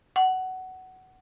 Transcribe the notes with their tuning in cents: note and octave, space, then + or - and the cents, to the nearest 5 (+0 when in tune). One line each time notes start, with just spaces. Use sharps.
F#5 +15